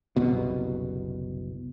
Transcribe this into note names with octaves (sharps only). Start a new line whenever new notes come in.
F#1 C2 B2